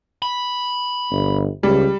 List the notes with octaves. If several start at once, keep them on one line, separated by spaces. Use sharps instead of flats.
B5
G1
C#2 G3